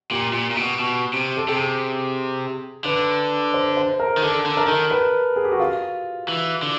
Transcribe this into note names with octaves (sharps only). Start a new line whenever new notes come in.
A#2 G4
A#2
A#2
B2
B2
C3
A4
C3 G#4
D3 B4
C5
C5
A#4
D#3
D3 A4
D3
A#4
D#3
B4
G#4
G4
F#4
F4
E3
D3